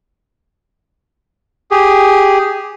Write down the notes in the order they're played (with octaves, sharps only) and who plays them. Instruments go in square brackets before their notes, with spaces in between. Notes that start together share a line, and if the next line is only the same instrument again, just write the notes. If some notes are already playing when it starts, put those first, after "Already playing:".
[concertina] G4 G#4